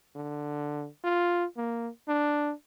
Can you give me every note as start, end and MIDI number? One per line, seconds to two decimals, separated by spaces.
0.16 0.87 50
1.04 1.45 65
1.57 1.89 58
2.09 2.52 62